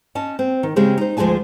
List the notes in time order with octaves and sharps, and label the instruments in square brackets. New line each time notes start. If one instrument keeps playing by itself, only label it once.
[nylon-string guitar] C#4 D#5 A5
C4
D#3
C#3 G#3 C4 G4 G#4
D#4 C5
D2 F3 G#3 G#4 G#5 A5